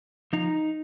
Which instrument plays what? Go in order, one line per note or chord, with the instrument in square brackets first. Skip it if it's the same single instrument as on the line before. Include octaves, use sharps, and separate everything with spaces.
[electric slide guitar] F3 D#4